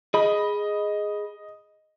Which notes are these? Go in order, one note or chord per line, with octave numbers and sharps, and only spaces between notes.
G#4 D#5 B5